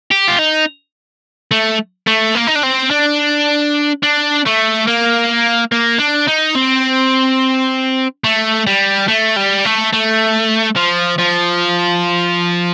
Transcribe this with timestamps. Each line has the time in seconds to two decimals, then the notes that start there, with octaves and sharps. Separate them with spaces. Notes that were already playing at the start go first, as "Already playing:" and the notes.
0.11 G4
0.28 F4
0.39 D#4
1.51 A3
2.07 A3
2.35 A#3
2.47 D#4
2.56 D4
2.63 C4
2.91 D4
4.03 D4
4.46 A3
4.87 A#3
5.72 A#3
5.99 D4
6.28 D#4
6.56 C4
8.24 A3
8.67 G3
9.08 A3
9.36 G3
9.65 A3
9.93 A3
10.76 F3
11.19 F3